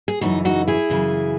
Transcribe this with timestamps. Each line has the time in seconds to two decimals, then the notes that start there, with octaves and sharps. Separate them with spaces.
0.08 G#4
0.21 F#2 C#3 E3 D#4 F#4
0.45 D#4 F#4
0.68 E4 G#4
0.90 F#2 C#3 E3